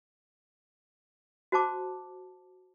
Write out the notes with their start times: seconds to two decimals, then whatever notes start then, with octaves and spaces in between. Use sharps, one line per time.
1.52 F#4 C5 A5 D6